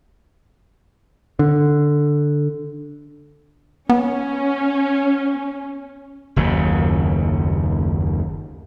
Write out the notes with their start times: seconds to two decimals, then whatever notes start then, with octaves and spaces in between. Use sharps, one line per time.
1.39 D3
3.90 B3 C#4
6.36 F#1 D#2 C#3